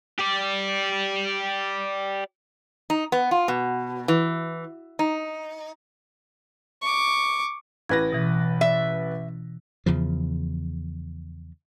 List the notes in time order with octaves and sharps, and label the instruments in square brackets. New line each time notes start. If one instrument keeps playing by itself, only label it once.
[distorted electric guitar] G4 D5
[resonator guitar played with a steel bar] D#4
B3
F4
B2
E3
D#4
[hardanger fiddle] C#6 D6
[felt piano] A1 B4 A#6 [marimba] G#6
[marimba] B2 E3
[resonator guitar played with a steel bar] E5
[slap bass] E2 C#3 F3